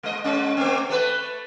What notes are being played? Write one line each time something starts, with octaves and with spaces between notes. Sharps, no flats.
G#3 D#5
G#3 C#4
A3 C4
A3 B4